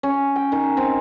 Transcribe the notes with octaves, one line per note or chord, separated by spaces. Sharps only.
C#4
G5
D#3
C4